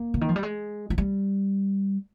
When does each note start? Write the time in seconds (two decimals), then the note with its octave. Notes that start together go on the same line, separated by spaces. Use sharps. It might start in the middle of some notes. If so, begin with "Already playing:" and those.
Already playing: A#3
0.14 D3
0.21 D#3
0.29 F3
0.36 G3
0.43 G#3
0.90 F3
0.98 G3